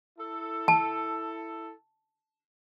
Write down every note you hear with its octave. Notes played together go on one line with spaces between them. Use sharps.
E4 A4
A5